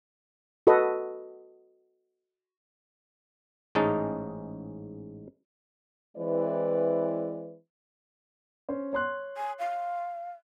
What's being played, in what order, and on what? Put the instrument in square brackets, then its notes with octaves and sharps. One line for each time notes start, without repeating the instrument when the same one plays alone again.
[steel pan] F#4 A4 B4 D#5
[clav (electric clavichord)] A1 G#2 G#3 C#4 D#4 A5
[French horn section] E3 G#3 C4 E4 B4 D5
[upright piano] C#4 C5
C#5 C6 F#6
[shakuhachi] G#5
F5